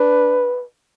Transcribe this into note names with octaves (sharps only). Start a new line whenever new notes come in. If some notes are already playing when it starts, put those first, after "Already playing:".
Already playing: D4 B4